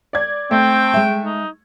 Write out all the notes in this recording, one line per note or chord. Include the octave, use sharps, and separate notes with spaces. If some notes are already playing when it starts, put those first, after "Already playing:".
D5 G#6
A3 C4 G5
G#3 E5
D#4